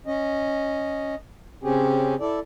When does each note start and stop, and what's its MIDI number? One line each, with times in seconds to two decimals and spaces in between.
0.07 1.15 61
0.07 1.15 75
1.63 2.15 49
1.63 2.15 60
1.63 2.15 61
1.63 2.15 67
1.63 2.15 68
2.20 2.40 64
2.20 2.40 69
2.20 2.40 74